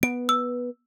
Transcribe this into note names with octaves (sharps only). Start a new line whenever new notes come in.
B3 D7
E6